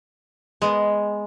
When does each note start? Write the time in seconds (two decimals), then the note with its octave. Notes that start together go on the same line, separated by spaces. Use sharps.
0.62 G#3 B3